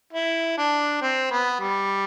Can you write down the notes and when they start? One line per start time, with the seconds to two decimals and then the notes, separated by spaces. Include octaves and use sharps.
0.13 E4
0.57 D4
1.02 C4
1.31 B3
1.60 G3